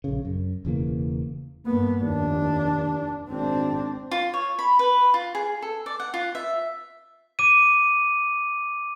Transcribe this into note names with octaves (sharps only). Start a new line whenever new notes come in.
A#1 C#3
F#2
E1 C#3 E3 A#3
G2 A#3 B3
F1 D#2 D4
G#1 C4 D4
F4
C#5
B5
B4
F4
G#4
A4
D5
F#5
F4
E5
D6 D#7